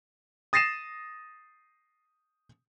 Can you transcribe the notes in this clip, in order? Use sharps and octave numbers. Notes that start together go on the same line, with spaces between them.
D#6 A6 A#6 C7 D#7 E7